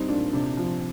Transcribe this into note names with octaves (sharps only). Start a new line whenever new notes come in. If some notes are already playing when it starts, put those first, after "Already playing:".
Already playing: G3 C4 D#4
A#2 D4
C3 D4
F3